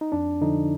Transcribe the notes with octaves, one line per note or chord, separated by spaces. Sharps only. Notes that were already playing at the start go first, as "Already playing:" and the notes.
D#4
F2 D4
D3 F3 D#4